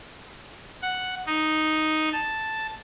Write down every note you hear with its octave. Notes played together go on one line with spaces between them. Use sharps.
F#5
D#4
A5